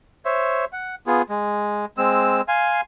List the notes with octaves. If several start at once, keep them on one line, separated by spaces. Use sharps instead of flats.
C5 C#5 E5
F#5
B3 F4 G#4
G#3
G#3 C4 E6
F5 G#5 C6